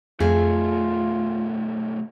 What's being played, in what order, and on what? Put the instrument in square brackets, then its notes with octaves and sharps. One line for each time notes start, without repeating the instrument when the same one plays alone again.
[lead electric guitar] B1 A3 [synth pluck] F2 [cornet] F4 [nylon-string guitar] G#4